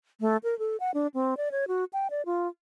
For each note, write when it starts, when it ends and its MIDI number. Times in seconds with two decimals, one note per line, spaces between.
0.21 0.37 57
0.44 0.57 70
0.59 0.77 69
0.80 0.91 78
0.94 1.07 62
1.14 1.37 60
1.37 1.49 74
1.52 1.68 73
1.68 1.84 66
1.93 2.08 79
2.10 2.25 74
2.26 2.48 65